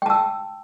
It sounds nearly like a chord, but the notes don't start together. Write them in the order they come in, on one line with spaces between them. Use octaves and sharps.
G5 A5 E6